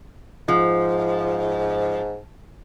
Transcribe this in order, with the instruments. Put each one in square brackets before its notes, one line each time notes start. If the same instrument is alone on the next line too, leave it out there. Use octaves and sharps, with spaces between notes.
[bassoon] G#2 [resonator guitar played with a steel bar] F3